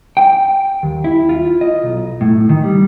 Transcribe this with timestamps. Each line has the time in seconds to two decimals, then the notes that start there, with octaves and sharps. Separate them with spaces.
0.17 G5
0.83 D#2
1.04 E4
1.29 F4
1.61 D#5
1.83 B1
2.21 A2
2.49 D#3
2.63 G3